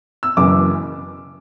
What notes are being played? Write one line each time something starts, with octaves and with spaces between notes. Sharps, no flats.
E6
F#1 F#2 C#3 E3 D6